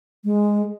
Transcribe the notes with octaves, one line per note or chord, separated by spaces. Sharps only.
G#3